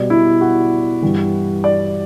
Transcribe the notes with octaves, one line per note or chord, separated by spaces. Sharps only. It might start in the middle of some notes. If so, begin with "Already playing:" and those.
Already playing: B2 G3 D5
E4
F#4
G2 E3 G3
D5